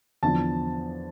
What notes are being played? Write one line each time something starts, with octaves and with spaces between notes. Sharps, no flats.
E2 D3 F3 A5